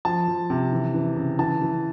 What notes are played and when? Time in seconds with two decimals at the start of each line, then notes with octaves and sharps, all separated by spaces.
0.05 F3 A5
0.28 F3
0.50 C3
0.72 E3
0.94 E3
1.16 C#3
1.39 E3 A5
1.61 E3